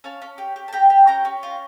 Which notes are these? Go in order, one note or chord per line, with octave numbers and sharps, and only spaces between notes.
C#4 F5 A5
C#4
G4
G4
A5
G4 G5 A#5
G4
C#4 G5 A#5
C#4
F4